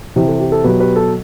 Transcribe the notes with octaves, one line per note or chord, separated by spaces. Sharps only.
C3 E3 G4
A4
G4
A4
B2 F#3 G4 B4
G4 B4
A4